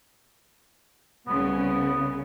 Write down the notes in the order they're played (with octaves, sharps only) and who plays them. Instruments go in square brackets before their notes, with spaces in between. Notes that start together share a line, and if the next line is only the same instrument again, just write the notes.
[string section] C2 C#3 [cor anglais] B3